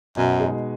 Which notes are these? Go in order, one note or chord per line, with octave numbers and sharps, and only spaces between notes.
F#2 B2
G#3 D#4 G#4